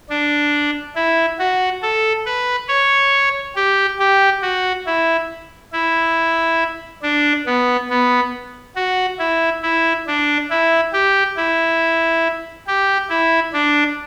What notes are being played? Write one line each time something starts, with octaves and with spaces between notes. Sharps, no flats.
D4
E4
F#4
A4
B4
C#5
G4
G4
F#4
E4
E4
D4
B3
B3
F#4
E4
E4
D4
E4
G4
E4
G4
E4
D4